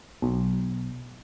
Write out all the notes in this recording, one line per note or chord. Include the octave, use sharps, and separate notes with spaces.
B1